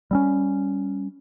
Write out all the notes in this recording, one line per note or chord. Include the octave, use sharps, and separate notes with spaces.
G3 C4 C#4